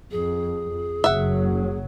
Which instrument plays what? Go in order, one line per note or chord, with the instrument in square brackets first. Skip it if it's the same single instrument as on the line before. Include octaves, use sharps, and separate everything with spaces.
[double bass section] F2 [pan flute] G#4
[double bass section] F#1 F#3 [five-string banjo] E5 F#5